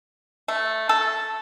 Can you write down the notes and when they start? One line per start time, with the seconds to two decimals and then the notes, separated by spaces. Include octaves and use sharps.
0.48 A3
0.89 A4